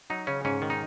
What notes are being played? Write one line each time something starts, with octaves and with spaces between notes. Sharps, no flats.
F#3 D#4
C#3 C#4
G#2 C#4
D#3
D#4